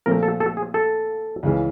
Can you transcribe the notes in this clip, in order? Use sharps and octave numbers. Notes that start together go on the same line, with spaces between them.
A#2 F3 A3 A#4
A4
A4
G#4
A4
C#2 C#3 E3